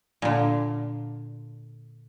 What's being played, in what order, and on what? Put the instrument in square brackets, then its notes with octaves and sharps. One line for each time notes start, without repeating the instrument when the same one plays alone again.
[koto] A#2 D3